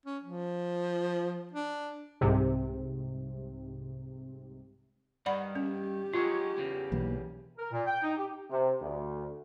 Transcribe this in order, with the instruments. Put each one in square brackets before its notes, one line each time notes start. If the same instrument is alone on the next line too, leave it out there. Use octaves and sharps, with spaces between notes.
[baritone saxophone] C#4
F3
D4
[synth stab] C2 G#2 C3
[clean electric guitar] G2 D#3 [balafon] D5 F#5 B5
[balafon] C#4 [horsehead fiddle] G4
[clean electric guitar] F#3 G#3 C#4 [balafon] F4
[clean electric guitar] E2 C#3
[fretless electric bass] B1 E3 A#3
[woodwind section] A#4
A#2
G5
D#4
G4
[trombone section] C3
D2